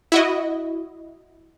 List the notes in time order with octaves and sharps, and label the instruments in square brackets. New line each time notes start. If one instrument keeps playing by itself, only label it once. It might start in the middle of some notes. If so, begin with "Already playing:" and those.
[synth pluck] E4 F#4 D#5